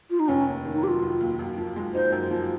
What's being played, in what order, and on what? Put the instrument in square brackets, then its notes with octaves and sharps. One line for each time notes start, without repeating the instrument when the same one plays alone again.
[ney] F4
D#4
[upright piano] F1 [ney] C#4
[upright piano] D#2
D#3
[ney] D#4
[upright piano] F#3 [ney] G4
[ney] F4
[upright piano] F1
D#2
F#2
F3
G#3
[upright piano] D#4 [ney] C5
[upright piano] F#2
F3